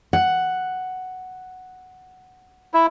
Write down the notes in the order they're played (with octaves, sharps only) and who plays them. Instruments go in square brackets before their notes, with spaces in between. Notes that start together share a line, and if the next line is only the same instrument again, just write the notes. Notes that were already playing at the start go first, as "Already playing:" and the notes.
[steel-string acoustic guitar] F#5
[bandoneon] E4